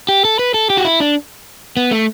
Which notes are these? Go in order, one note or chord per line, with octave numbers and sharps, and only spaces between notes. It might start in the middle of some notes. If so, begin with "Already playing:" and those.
G4
A4
B4
A4
G4
F#4
E4
D4
B3
A3